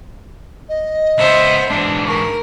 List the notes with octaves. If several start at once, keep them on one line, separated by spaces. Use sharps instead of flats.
D#5
C#2 B3 C5 E5
G#2 E3 D4
A#4 C#6